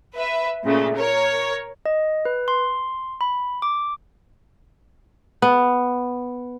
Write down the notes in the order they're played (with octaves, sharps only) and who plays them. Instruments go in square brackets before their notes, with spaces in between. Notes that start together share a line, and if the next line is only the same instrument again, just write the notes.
[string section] B4 E5
A#2 C#3 A3
A#4 C#5
[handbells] D#5
B4
C6
B5
D6
[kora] B3